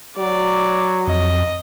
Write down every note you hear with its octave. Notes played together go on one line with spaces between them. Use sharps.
F#3 D5
F2 D#5